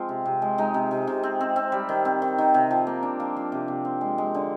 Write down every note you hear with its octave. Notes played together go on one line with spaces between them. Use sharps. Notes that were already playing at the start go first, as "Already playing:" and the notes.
Already playing: F3 G#3 C4 F4
C3
C3
G#3
G#3 D#4
C3
C3
C3
C4
C4
C4
G3
D#3
C4
D#3
D#3
C3
F3
A#3
D4
F3 F4
F3
C3
C3
C4
G#3
G#3
D3